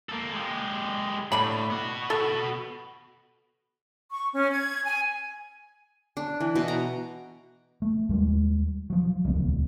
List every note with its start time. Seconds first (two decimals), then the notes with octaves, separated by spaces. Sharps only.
0.09 A#3 A4
0.33 G#3 G4
1.32 A2 D3 B5
1.70 B3 F#4
2.10 A4
4.11 C#6
4.34 C#4
4.51 G#6
4.84 G#5
6.17 D4
6.40 E3
6.55 B2
6.68 A#5
7.82 A3
8.09 D#2 G3 G#3
8.90 F3 F#3
9.25 D#1 C#2 B3